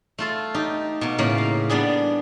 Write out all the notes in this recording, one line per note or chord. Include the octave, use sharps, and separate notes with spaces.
A3 F4 A4
D#4 G4
B2 A#3
A2 C#3 A#3
F5
G3 B3 D4 G#4